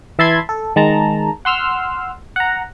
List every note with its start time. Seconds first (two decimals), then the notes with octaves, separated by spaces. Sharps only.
0.19 E3 E5 A5 B5 C6 G#6
0.49 A4
0.76 D#3 G#3 A5 A#5
1.45 F#5 C6 E6 F6
2.36 F#5 A#5